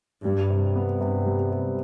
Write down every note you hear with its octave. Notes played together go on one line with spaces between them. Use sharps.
G2 G3
C3
B3
G2 C3
G3
C3